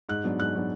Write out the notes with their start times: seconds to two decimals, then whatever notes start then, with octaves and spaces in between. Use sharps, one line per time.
0.09 G#2 F#6
0.24 F#3 B3 D4
0.39 G#2 F#6
0.55 F#3 B3 D4